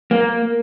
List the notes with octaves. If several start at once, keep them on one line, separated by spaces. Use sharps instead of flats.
A#3